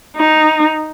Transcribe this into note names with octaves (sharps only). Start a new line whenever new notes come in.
D#4